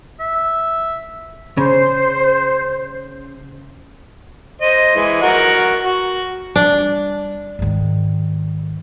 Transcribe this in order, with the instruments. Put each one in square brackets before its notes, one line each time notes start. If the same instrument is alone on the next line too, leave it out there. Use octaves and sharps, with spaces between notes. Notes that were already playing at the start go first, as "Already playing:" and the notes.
[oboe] E5
[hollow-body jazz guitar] C#3 [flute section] C5
[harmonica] C5 D#5
E3 G#3
F#4 A#4 F#5
F#4
[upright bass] G3 [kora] D4
[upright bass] G#2 D#3